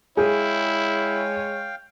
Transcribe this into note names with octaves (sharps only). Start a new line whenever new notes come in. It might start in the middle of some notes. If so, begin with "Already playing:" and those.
G#3 E4 G#4 C#5 F5 G5